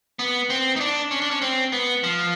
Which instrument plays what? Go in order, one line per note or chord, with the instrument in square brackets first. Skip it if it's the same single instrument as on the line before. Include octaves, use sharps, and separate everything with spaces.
[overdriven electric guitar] B3
C4
D#4
D4
C#4
D4
C#4
C4
B3
F3